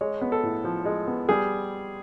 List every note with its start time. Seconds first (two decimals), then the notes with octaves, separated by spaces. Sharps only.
0.01 G#3 C#5
0.21 B3
0.32 A4
0.43 A2
0.64 F3
0.85 G#3
1.07 B3
1.29 G3 G#4